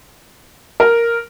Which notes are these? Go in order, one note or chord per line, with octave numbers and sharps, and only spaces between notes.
A#4